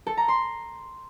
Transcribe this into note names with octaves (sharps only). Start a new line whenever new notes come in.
A4
A#5
C6